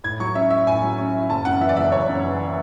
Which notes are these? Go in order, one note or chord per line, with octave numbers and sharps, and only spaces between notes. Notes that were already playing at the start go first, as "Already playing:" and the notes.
A2 G#6
F#3 C#6
C#4 E5
E4 E5
A2 G#5
F#3
C#4
E4
F#1 A5
F#2 F#5
E3 E5
D5
F#1 E5
F#1 C#5
F#2
E3